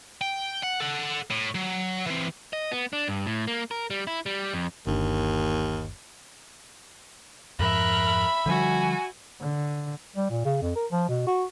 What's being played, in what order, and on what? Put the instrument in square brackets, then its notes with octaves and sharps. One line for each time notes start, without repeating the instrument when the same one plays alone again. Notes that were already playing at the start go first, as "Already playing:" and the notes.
[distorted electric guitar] G5
F#5
A4 F#5
A2
F#3
E3 C4
[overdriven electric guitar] D#5
B3
D4
G2
A2
A#3
A#4
G3
E4
G3
F2
[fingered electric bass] G1 C#4 D4 [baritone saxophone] D#2
[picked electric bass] F2 G#2 F3 [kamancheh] A#4 F#6 [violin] E5 B5
[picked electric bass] D3 F3 G3 [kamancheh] F#4 G#5
[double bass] D3
[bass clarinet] G3
A#2
C#3
F2
A#4
F3
B2
F#4